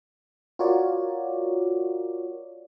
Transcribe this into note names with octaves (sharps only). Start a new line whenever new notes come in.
F4 F#4 A#4 C#5 D5